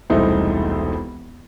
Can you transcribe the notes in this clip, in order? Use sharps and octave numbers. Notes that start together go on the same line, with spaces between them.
E1 C2 A3 D#4 E4 C5